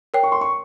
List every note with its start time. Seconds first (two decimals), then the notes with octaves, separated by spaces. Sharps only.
0.14 A#4 C#5 G5
0.23 C#6
0.32 C6
0.41 C#6